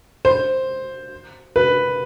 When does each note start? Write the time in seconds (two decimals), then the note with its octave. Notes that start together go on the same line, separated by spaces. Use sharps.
0.25 C5
1.56 B4